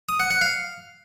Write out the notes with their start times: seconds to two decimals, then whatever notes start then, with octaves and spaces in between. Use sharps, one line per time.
0.09 D#6
0.20 F#5
0.30 F#5
0.41 F5